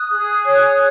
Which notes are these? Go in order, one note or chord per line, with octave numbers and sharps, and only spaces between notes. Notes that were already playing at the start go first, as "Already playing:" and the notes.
Already playing: D#6 F#6
G#4
C#5